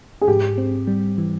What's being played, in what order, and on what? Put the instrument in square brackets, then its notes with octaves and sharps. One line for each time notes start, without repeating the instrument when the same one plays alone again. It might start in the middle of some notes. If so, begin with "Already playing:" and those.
[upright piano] G#4
[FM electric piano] G#2 [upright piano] G4
[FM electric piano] C4
G3
E3